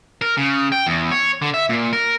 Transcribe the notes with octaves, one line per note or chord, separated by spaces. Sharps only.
A#4
C#3
G5
E2
C#5
D3
E5
A#2
A#4